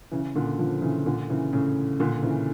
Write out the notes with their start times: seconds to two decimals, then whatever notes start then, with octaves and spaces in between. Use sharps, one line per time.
0.12 C#3 E3
0.35 A#2 D3
0.58 D3 F3
0.82 C#3 E3
1.06 A#2 D3
1.29 C#3 E3
1.53 A2 C#3
2.00 A#2 D3
2.23 C#3 E3